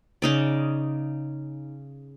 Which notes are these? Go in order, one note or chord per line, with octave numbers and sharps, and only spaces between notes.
C#3 D#4 D5